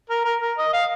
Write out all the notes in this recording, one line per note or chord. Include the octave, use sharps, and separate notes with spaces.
A#4
A#4
A#4
D#5
F5